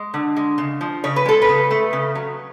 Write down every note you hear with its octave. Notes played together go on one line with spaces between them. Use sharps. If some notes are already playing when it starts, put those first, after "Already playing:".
Already playing: G#3
D3
G#3
C#3
F3
C#3 C#5
B4
G#3 A4
B4
C#3
A3
C#3
F#3